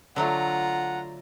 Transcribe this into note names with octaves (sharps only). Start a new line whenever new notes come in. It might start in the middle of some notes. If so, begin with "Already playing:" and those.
D3 F#3 A3 F4 F#5 A#5